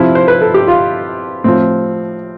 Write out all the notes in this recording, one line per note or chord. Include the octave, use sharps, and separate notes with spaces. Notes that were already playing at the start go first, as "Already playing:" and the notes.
Already playing: C3 F3 E4
C5
B4
A4
G4
F4
A2 F3 C4